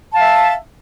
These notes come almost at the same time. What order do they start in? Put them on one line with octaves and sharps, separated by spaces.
A5 F5 E5